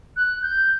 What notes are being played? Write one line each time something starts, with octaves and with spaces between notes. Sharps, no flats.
F#6
G6